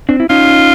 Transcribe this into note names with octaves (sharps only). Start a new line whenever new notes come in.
C4 D4
E4
C#4 D#4 F4